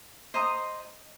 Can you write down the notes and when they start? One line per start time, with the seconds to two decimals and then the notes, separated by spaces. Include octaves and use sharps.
0.34 C5 D#5 A#5 D#6